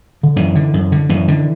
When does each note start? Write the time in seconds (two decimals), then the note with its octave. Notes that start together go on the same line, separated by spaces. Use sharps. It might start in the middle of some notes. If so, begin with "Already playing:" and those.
0.23 D3
0.36 F#2 E3
0.55 D3
0.73 F#2
0.92 D3
1.09 F#2 E3
1.28 D3